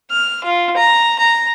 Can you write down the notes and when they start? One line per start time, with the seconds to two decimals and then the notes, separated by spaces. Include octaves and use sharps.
0.11 F6
0.44 F4
0.77 A#5
1.19 A#5